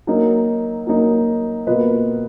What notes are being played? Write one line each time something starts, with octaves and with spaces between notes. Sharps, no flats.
F#3 A#3 D#4
F#3 A#3 D#4
B2 A#3 F4 B4 D#5